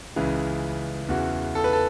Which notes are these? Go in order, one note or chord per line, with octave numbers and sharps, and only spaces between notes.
C#2 C#3 E3
E2 C#3 E3 F#4
A4
B4
A4